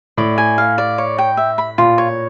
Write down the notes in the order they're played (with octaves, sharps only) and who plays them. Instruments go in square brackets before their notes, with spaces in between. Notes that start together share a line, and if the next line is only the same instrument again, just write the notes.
[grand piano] A2 [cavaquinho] D5
[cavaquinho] G#5
F5
D5
C#5
G5
E5
B5
[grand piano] A#2 [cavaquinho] F4
[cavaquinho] C#5